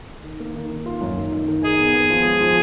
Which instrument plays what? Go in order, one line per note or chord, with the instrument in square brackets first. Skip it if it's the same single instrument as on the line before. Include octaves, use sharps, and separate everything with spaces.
[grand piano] D#3
A#3
D#3
D#3
F4
F#2
D#3
D#4
D#3
[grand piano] D#4 [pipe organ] G#4
[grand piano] B3
B3
F3
G#3
F3